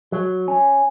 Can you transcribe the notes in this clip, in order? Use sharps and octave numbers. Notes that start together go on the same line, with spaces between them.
F#3
C#4